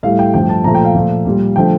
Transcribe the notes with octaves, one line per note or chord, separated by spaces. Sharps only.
A2 G3 F5
G5
G2 F3 A3 G5
A5
A#2 F3 A3 A#5
G5
F5
A#2 F3 A3
A#2 G3
D3 F3 A3 G5